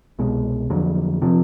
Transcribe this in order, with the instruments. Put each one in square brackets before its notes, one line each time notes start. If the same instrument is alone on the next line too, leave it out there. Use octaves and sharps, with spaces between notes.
[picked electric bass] C2 B2 G#3
F2 D3 F#3
C3 F3